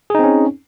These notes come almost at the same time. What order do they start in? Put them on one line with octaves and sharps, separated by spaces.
G#4 D#4 C4 C#4